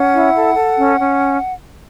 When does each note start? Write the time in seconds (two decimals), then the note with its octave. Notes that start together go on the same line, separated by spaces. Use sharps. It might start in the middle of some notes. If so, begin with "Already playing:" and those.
Already playing: C#4 F#5
0.14 E4
0.35 A4
0.55 A4
0.77 C#4
0.98 C#4